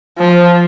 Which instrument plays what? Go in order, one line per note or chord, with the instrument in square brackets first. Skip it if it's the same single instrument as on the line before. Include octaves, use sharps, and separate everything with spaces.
[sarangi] F3